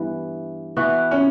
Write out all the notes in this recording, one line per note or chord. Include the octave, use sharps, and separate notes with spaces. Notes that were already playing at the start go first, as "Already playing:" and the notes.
Already playing: G2 E3 B3
E3 B3 F#4
C#4